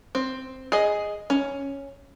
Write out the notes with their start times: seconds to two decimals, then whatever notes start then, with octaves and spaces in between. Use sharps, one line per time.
0.15 C4
0.72 G#4 D#5
1.30 C#4